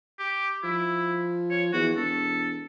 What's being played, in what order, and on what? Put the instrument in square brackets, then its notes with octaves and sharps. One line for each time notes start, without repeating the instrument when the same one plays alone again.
[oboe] G4
[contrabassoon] F3 [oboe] E4
[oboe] C#5
[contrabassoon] E2 [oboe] F#4
[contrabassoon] E1 [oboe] A4